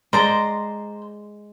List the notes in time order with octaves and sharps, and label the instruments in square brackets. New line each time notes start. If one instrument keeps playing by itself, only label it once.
[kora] G#3 D5 [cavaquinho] C5 A#5